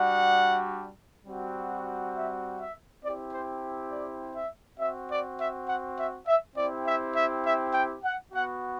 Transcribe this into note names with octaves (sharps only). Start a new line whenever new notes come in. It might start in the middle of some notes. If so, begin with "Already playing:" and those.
Already playing: G3 D4 F#4 F#5
G3 C4 F#4
E5
E5
C4 E4 G4 D5
C5
D5
E5
C4 F#4 E5
D5
E5
F#5
E5
E5
C4 E4 G4 D5
E5
E5
E5
G5
F#5
B3 F#4 F#5